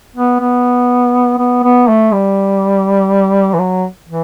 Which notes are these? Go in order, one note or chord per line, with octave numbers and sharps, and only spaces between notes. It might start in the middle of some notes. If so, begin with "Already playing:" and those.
B3
B3
B3
B3
A3
G3
E3
F#3
E3